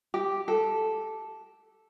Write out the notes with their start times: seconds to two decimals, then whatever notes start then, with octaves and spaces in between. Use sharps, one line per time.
0.14 G4
0.48 A4